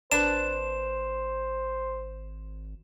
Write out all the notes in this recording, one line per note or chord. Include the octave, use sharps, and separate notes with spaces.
G#1 D4 B4 C5 E7